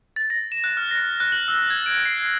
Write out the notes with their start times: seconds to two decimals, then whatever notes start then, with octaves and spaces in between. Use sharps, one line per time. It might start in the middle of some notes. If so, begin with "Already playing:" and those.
0.16 A6
0.30 A#6
0.52 E7
0.64 F#6
0.77 F6
0.91 A#6
1.20 F#6
1.32 F#7
1.48 E6
1.70 G#6
1.86 D7
2.05 C7